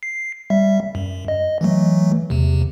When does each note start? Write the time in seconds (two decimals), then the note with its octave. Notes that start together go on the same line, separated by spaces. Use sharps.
0.03 C7
0.50 G3 E5
0.95 F#2
1.28 D#5
1.61 E3 F#3 A3
2.30 E2 C3